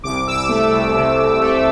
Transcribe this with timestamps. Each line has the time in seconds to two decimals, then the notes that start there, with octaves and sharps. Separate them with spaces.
0.04 C2 D6
0.27 C2 E6
0.37 D6
0.49 A3
0.72 C2
0.95 C3
1.18 C2
1.41 A3